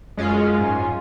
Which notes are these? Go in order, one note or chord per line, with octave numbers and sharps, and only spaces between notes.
F#2 G#3 C#4 F4
G#2